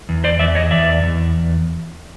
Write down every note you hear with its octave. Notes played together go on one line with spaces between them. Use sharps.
E2
C5 D5
E2 D5 E5
C#5 D#5
E2 D5 E5
E2